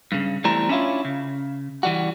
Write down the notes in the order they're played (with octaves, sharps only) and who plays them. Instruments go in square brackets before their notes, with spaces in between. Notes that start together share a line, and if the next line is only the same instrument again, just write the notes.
[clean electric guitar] G2 C#3
E2 G3 A3 C4 E4 A#5
C#4 D4 E4 F4 C#5
C#3
E3 G3 F#4